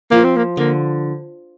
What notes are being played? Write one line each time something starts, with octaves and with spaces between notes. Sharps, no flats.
F3 A#3
C4
A#3
D3 A#3